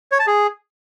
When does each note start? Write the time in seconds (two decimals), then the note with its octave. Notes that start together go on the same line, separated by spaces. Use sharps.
0.12 C#5
0.19 A5
0.27 G#4